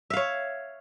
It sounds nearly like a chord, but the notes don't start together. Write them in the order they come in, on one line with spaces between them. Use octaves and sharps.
E5 F5 C#5